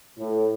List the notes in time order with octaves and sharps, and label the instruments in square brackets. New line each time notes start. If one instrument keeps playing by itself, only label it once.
[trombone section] A2